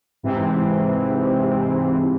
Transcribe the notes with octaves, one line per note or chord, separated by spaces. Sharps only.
G#2 C3 E3 C4